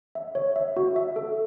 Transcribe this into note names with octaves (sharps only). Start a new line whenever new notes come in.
E5
C#5
E5
F#4
E5
A4